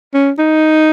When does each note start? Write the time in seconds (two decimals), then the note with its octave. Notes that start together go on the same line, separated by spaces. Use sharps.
0.14 C#4
0.38 D#4